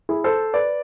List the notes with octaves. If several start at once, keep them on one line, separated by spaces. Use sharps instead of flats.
E4 G#4
A4 C5
B4 D5